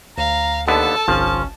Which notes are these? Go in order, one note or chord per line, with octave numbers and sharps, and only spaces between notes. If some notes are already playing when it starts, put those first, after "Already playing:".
D2 F5 A#5
D#2 D3 B3 A4 A5
G1 C2 F3 C#4 F6